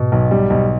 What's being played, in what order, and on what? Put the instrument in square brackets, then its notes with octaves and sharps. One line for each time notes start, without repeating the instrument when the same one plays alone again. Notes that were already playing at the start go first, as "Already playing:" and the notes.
Already playing: [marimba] G#2 [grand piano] B2
[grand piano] B1
G3
B1